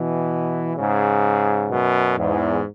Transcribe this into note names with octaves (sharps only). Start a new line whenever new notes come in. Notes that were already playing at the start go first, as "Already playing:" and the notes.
Already playing: B2 E3
G#2 C#3
F#2 B2
E2 G#2